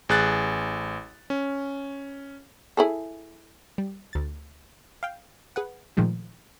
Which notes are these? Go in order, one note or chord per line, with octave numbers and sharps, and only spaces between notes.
A1 G#4 F#6 A6
C#4
E4 G#4 A4
G3
D2 A6
F5 G5
G#4 B4 F#5
A#2 D#3 F3 G#3 A3